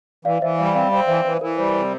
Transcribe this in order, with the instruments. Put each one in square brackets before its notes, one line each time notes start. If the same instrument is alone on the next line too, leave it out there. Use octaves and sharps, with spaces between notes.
[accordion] E3 [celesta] D5 F5
[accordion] E3 [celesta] C5 E5
[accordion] G3 [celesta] D5 F5
[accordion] C4 [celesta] D5 F5
[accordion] C4 [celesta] D5 F5
[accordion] E3 [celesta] C5 E5
[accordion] E3 [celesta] C5
[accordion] E3 [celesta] A#4
[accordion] G3 [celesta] C5
[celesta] A#4
[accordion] C3 [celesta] C5